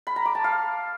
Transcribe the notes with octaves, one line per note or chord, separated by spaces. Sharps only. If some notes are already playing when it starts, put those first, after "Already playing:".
B5
A#5
D6
A5
F5